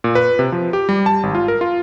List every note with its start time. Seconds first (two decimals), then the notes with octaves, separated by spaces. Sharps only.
0.04 A#2
0.15 B4
0.39 C3
0.52 F3
0.73 G4
0.89 G3
1.06 A5
1.23 G#1
1.35 F4
1.48 A#4
1.61 F4